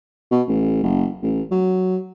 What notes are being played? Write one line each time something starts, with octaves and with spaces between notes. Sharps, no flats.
B2
A1
F#1
A1
F#3